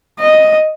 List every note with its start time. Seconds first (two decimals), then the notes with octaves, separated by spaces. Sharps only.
0.20 D#5